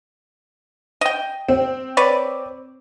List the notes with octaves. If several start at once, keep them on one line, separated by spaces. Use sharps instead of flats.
D#5 G5
C4
B4 C#5 D5